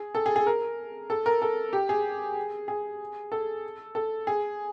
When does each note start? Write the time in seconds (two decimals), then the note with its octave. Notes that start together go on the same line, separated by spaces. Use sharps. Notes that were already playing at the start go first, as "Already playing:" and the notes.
Already playing: G#4
0.15 A4
0.26 G#4
0.36 G#4
0.47 A#4
1.10 A4
1.26 A#4
1.42 A4
1.73 G4
1.89 G#4
2.68 G#4
3.32 A4
3.95 A4
4.27 G#4